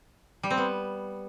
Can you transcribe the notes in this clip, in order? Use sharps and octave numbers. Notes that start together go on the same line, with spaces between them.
G3
C4
B3